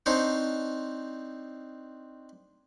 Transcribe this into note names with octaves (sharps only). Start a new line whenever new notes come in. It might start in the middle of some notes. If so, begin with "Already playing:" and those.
C4 D4 D#4 C5 C#5